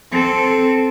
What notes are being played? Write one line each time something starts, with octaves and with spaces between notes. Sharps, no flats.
C4 A4